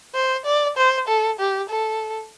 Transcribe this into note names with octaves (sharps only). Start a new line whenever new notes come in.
C5
D5
C5
A4
G4
A4